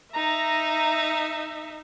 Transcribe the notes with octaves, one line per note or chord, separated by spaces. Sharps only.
D#4 E5 A#5